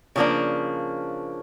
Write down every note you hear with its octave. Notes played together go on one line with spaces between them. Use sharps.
C#3 F3 A#3 D4